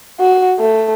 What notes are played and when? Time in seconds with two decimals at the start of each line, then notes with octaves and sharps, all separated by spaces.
0.20 F#4
0.59 A3